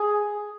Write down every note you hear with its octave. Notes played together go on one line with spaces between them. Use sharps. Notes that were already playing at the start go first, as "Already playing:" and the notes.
Already playing: G#4